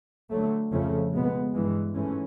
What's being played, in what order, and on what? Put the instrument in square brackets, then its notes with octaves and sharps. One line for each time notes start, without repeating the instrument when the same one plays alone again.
[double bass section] D3 F#3 A3
F2 C#3 F3 A3 C#4
B2 G#3 B3
G2 E3 G#3
G#2 E3 A3 C#4